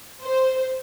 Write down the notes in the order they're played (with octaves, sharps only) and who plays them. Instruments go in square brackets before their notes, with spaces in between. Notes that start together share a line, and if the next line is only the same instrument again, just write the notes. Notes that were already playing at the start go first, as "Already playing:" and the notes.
[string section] C5